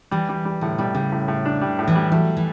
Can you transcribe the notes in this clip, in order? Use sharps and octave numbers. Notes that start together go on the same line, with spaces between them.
E3 G3
G3
G3
A2 D3
B2 G3
C#3 G3
A2
A2
D4
G3
A2
E3
G3
F#3 A3
E3